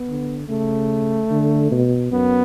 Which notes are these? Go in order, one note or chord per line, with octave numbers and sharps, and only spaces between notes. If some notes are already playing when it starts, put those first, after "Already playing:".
Already playing: B3
D3
C#3 A3
D3
B2
F#2 B3